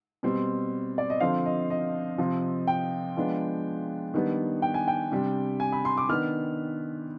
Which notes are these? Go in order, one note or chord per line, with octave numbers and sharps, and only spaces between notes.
B2 G3 C4
D5
D#5
D3 F3 C4 F5
D#5
D#5
C3 F3 C4
G5
F3 G#3 B3 D4
D#3 G3 B3 D4
G5
G#5
G5
C3 G3 D4
G#5
B5
C6
D6
D#3 B3 D4 F6